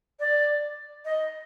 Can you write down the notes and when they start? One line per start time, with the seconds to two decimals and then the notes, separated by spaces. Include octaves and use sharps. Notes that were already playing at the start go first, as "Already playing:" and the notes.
0.19 D5
1.05 D#5